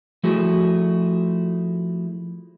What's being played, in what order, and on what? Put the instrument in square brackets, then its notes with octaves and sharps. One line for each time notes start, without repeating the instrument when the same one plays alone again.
[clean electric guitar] F3 A3 E4 F#4 G#4